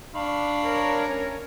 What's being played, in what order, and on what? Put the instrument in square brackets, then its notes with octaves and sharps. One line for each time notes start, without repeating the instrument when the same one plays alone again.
[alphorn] D4 [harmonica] F5 B5 C#6
[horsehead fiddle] A#4 C#5
[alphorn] C#4